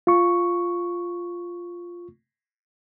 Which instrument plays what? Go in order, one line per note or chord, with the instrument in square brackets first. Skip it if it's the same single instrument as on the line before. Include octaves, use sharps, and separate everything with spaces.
[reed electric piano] F4 C#6